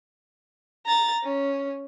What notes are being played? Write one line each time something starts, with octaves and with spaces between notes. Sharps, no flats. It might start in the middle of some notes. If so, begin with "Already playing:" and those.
A#5 A6
C#4